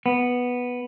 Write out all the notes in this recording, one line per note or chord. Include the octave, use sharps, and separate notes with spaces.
B3